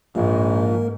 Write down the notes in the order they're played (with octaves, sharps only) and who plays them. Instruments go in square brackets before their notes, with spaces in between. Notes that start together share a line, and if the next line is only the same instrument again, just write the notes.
[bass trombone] A#1 [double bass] G#2 [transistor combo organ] F3 [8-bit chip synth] A#3 A#4